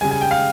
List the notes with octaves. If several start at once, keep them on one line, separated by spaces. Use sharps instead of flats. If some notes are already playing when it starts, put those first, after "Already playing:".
C#3 G3 G#5
G#5
G5
F5